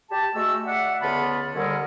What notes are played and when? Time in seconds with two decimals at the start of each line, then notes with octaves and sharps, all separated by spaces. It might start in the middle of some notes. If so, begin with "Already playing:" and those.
0.11 G4 A5
0.35 G#3 A3 F#4 E6
0.66 D5 E5 F#5
1.01 C#2 D3 B3 F4 A5 B5
1.55 D#2 D3 G3 C#4 G#4 A#4